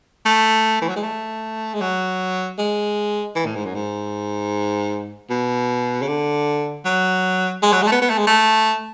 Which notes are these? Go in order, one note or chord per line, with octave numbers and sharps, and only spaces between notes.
A3
E3
F#3
G#3
A3
G#3
F#3
G#3
E3
A2
G#2
F#2
G#2
B2
C#3
D3
F#3
G#3
F#3
G#3
A3
B3
B3
A3
G#3
A3